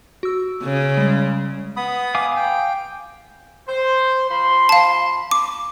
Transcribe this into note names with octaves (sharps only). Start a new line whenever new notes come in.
F#4 E6
C#3
G3 G#3
B3 B5 D#6
F5 G#5 D6
G5
C5
F3 B5 C6
F5 A5
D6